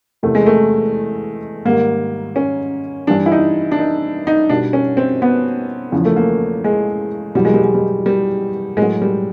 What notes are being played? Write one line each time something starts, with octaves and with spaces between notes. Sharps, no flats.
E2 C3 E3 A3
G#3
A3
G#2 D#3 G3 A#3
C#4
G2 E3 G3 D4
E4
D#4
D4
D#4
D#4
B2 G3 D4
C#4
C4
B3
E2 C#3 F3
A3
A#3
G#3
E2 B2 F#3 G3
G#3
G3
G#3
G3
G3
A2 G#3
F#3
G3